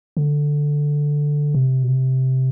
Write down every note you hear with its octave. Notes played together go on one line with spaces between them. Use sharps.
D3
C3
B2
C3